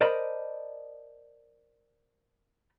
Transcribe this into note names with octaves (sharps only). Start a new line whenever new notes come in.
A#4 C5 D5 D#5 A5 B5